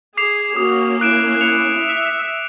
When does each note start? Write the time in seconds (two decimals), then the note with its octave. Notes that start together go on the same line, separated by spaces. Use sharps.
0.17 G#4 D6 C7 F7
0.56 A#3 C#4 F#4 D#6
1.01 E4 F#6 D7 E7
1.41 C#7 F7
1.78 E5